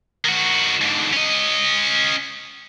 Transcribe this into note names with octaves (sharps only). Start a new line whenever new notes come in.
D#3 F#4
G#2 D3
C#4 D#5